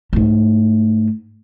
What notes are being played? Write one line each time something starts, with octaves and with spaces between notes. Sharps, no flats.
G#2 A3